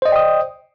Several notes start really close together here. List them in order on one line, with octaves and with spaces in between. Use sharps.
C5 D#5 D5 G5 D#6